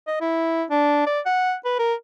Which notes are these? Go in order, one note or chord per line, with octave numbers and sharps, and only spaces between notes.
D#5
E4
D4
D5
F#5
B4
A#4